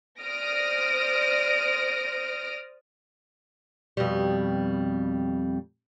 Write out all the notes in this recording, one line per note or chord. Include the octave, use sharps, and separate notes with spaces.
C5 D5 D#6 F6 A#6 D7
F2 B2 G3